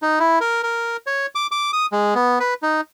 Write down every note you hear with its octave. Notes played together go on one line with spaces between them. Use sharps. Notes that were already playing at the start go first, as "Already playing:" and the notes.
D#4
E4
A#4
A#4
C#5
D6
D6
D#6
G#3
B3
B4
D#4